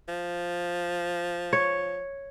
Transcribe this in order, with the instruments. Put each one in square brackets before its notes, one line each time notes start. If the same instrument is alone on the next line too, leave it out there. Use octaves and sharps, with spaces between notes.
[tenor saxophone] F3
[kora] C#5